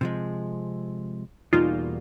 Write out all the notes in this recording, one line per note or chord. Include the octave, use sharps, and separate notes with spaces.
C3 F3 G#3
E2 B2 G3 A#3 D#4 F4